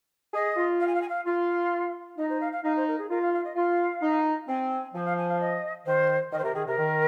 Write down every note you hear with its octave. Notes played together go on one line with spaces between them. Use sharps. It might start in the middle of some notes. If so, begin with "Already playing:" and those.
G#4 D#5
F4
F5
G#5
F5
G#5
F5
F4 F5
D#4 D#5
C5
F5
F5
D#4 F5
C5
A#4
G#4
F4 A#4
F5
F5
D#5
F4 F5
D#4
C4 G#5
G#5
F3 G#5
F5
G#5
F5
D#5
D#3 C5
D#3 D#5
C5
C3 A#4
D#3 G#4
C3 A#4
D#3